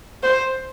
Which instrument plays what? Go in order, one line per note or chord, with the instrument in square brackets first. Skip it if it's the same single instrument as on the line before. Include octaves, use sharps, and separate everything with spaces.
[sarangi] C5